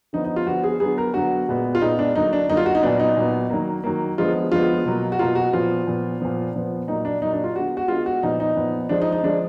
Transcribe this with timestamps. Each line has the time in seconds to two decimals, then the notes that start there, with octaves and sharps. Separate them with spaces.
0.13 D3 F3 B3 D#4
0.25 D#4
0.36 F4
0.46 D3 F3 B3 F#4
0.64 G#4
0.80 D3 F#3 B3 G#4
0.98 A#4
1.14 D3 F#3 B3 F#4
1.48 A#2 G#3 B3
1.75 F4
1.81 A#2 G#3 B3 D#4
1.99 D4
2.15 D3 F#3 A#3 D#4
2.33 D4
2.49 D3 F#3 A#3 D#4
2.57 F4
2.66 F#4
2.75 D#4
2.83 A#2 F#3 B3 D4
3.00 D#4
3.17 A#2 F#3 B3
3.50 D#3 F#3 A#3
3.84 D#3 F#3 A#3
4.18 D3 F3 G#3 B3 F4
4.52 D3 F3 G#3 B3 F4
4.86 B2 F#3 A#3
5.12 F#4
5.19 B2 F#3 A#3 F4
5.35 F#4
5.52 A#2 F3 B3 F4
5.87 A#2 F3 B3
6.20 A#2 F3 B3
6.54 A#2 F3 B3
6.87 A#2 F#3 A#3 D#4
7.05 D4
7.21 A#2 F#3 A#3 D#4
7.33 D4
7.44 F4
7.55 D3 G#3 B3 F#4
7.77 F#4
7.88 D3 G#3 B3 F4
8.06 F#4
8.23 A#2 F3 B3 D#4
8.40 D#4
8.56 A#2 F3 B3
8.89 D3 F3 G#3 D4
9.02 D#4
9.12 D#4
9.23 D3 F3 G#3 D4